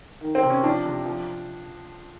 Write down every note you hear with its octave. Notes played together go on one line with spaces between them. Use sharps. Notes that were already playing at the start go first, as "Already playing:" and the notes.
D#3
C4
C3
C#4
F3 D4
C3
F3